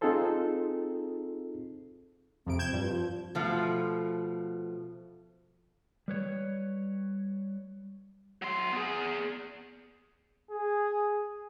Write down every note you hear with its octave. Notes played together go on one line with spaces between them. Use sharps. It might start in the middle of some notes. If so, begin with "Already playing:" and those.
C4 D#4 F4 G#4 A4 C5
F2 C3 C4 D7
G6 G#6 E7
G2 F3
F3
B2 F3 A3
G3 B4 C#5
F#3 C6
B3 G#4
G#4